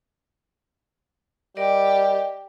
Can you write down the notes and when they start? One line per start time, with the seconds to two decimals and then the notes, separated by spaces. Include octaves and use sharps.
1.57 G3 G4 A#4 D5 D#5